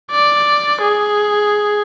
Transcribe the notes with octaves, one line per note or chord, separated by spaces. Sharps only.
D5
G#4